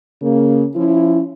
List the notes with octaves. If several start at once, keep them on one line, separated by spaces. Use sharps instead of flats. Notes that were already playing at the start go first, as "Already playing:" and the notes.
C#3 A#3
F3 C#4 E4